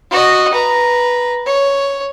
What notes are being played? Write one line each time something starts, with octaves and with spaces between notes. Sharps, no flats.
F#4 D#5
B4 A#5
C#5